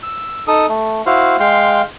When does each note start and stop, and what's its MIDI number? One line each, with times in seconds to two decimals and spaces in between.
0.03 0.44 88
0.47 0.66 63
0.47 0.66 69
0.47 0.66 87
0.69 1.02 57
1.06 1.36 64
1.06 1.36 66
1.06 1.36 72
1.06 1.36 77
1.40 1.82 56
1.40 1.82 77
1.40 1.82 79
1.40 1.82 84